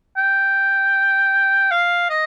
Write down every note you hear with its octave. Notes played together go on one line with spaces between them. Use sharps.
G5
F5
D#5